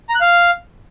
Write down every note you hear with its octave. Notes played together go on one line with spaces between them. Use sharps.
A#5
F#6
F5